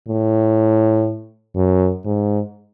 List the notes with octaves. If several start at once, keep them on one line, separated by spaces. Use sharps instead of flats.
A2
F#2
G#2